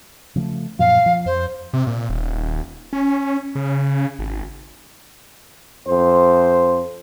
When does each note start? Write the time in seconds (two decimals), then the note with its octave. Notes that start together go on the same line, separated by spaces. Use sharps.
0.36 C#3 F3 A3
0.79 F#2 A#2 F3 F5
1.06 F3
1.25 F2 C5
1.73 C3
1.87 A#2
2.09 D#1
2.93 C#4
3.55 C#3
4.19 G#1
5.87 F2 C5